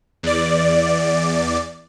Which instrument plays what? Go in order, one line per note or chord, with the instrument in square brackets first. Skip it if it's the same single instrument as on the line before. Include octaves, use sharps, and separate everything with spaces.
[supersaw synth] E2 D5